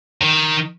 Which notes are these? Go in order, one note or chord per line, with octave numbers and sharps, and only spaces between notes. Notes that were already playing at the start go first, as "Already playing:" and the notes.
D#3